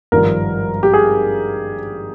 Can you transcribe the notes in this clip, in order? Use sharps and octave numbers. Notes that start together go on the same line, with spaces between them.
G#1 G2 F3 A#4
G4
G#4